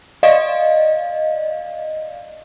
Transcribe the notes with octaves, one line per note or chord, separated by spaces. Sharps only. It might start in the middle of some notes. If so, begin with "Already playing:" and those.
D5 D#5 F5